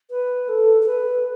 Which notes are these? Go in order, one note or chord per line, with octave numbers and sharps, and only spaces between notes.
B4
A4
A4
B4